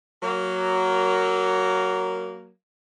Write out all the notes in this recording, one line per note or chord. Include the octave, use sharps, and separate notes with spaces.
F#3 A#3